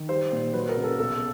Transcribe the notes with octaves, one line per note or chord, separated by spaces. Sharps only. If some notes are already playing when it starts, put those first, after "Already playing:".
Already playing: D#3
G3 C5
A#2
F#3 B4
A#4
C#3
A4
B1 A4